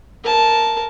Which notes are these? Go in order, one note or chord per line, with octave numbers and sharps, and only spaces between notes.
A#4 A5